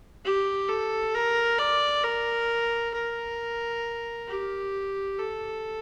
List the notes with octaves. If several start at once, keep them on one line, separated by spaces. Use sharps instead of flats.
G4
A4
A#4
D5
A#4
A#4
G4
A4